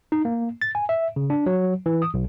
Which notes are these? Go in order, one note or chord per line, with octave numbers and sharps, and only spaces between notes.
D#4
A#3
A6
G#5
E5
C#3
D4
F#3
E3
D#6
B1